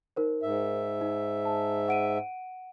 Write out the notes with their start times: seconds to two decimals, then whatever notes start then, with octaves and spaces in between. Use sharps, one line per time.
0.16 D#4 A#4 C5
0.43 G#2 E5
1.01 D#4
1.45 A5
1.88 F#5 D7 D#7